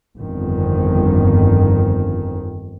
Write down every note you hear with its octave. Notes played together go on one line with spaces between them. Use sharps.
G1 F2 D#3